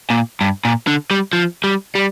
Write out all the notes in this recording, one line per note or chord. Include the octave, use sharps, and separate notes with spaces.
A#2
G2
A#2
D3
G3
F3
G3
G3